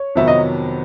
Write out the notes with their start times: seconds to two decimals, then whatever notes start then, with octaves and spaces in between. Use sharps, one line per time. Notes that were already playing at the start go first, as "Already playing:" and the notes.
Already playing: C#5
0.16 F2 C3 D#3 F#3 B3 E5
0.28 D#5